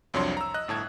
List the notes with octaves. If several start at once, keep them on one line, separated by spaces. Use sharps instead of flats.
C2 F2 F#3 D4 C#5 C6
A#5 E6
D#5 F#6
G1 A2 A5 G#6